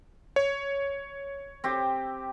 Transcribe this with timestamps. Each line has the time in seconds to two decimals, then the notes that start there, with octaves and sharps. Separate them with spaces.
0.36 C#5
1.64 C4 G4